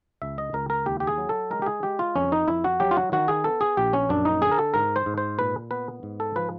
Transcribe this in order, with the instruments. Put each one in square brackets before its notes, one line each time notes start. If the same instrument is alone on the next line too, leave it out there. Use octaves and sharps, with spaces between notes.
[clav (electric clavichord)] C#2 E5
D#5
C#2 A#4
A#4
D#2 G4
G4
G#4
F#3
A4
G#3 A#4
G4
G#4
G#3 G4
F4
F2 C#4
D#4
F2 E4
F#4
F#3 G4
F4
F#4
D#3 F#4
G#4
B3 A4
G#4
A#1 G4
C#4
F#2 D4
D#4
D3 G#4
A#4
A4
G#2 A#4
C5
G#2
C5
A#2 B4
B3 B4
G#2
A4
F3 B4